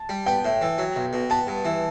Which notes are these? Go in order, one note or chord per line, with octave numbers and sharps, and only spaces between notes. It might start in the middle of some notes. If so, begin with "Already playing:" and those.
Already playing: A5
G3
B3 G5
A2
E3
F#3
B1
B2
B3 A5
G2
E3